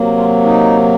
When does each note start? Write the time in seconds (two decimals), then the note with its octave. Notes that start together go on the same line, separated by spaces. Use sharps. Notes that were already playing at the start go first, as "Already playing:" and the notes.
Already playing: C3 F#3 A#3
0.17 F4
0.44 D#4